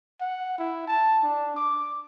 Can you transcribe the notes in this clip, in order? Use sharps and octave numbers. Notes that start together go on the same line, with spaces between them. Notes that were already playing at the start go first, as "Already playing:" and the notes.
F#5
E4
A5
D4
D6